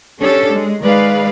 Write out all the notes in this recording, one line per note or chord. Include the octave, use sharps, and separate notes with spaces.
C#4 D4 G4 A4 C#5
G#3
D#3 G#3 G#4 B4 D5 F5